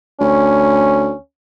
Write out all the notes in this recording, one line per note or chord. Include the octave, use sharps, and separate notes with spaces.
D2 C#4